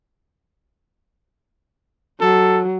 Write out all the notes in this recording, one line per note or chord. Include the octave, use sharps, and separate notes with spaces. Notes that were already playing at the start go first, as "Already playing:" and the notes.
F#3 A4